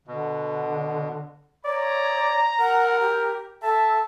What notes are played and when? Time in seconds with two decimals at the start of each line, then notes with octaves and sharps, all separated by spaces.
0.07 B2 D3
1.65 C#5 D5 A#5
2.59 A#4 F#5
3.01 G4
3.63 A4 E5 A5